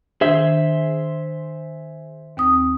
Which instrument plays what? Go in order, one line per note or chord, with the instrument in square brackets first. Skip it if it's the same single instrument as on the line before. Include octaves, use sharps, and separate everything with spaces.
[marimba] D#3 D4 [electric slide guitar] G#4 C5 E5
[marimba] D#2 C4 D#6